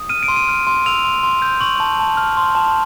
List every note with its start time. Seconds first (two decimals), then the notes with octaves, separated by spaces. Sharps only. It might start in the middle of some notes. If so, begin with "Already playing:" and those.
Already playing: D#6
0.09 F6 D#7
0.23 D7
0.28 C6
0.36 D#7
0.48 F6
0.67 C6
0.86 E6 F7
1.04 C6
1.23 C6
1.42 G6
1.61 C#6 F#7
1.80 A5
1.99 A5
2.17 F6
2.37 C6
2.55 A5